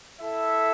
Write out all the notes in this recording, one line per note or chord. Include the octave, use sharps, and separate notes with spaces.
E4 A4 E5